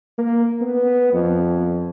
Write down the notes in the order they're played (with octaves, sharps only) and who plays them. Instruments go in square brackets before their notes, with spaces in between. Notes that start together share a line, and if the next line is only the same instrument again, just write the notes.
[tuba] A#3
B3
F2